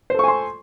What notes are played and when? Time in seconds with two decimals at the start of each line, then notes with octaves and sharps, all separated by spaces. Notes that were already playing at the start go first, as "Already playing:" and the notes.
0.10 C5
0.14 A4
0.19 C#6
0.24 G#5
0.28 C6